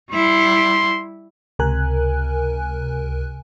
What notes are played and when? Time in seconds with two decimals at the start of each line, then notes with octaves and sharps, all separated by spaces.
0.11 G3 E4 C6
1.59 C#2 C3 A#4 G#5 F#6